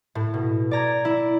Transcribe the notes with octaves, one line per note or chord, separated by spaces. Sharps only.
A2
B2
D5 A#5 G#6
E4